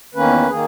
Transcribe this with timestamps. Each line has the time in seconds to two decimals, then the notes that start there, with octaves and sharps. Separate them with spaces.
0.15 E2 D#3 A#3 C#4 B4
0.49 D#3 A#3 G#4